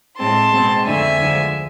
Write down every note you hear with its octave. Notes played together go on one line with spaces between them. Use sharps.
A2 G#3 C4 A5 C6
B2 G#3 C4
F2 D3 A3 C4 E5 G#5
D2 D3 F3 G#3